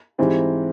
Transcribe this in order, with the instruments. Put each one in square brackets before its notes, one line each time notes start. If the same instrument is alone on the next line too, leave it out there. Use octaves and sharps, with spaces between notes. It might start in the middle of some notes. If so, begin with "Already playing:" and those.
[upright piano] G#2 E3 G3 C4